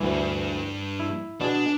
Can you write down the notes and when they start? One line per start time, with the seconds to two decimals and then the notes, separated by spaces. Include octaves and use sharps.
0.01 D2 G2 E3
1.00 E4
1.41 B2 D4 G#4